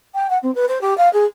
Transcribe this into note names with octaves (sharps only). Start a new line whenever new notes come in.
G5
F#5
C4
B4
C5
G4
F5
G#4